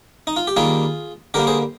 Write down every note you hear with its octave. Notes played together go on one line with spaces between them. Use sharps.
D#4
F4
G4
D#3 G3 A#3 F4 G#4
D3 G3 A#3 G4 A#4
G#4 C5